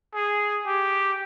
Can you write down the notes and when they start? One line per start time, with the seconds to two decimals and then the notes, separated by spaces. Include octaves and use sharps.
0.15 G#4
0.66 G4